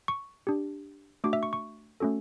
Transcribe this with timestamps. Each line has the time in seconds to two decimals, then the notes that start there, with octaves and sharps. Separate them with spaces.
0.08 C#6
0.47 D4 G4
1.24 A3 D4 F#4 D6
1.33 E5
1.43 C#6
1.53 C#6
2.00 A3 C#4 F#4 A4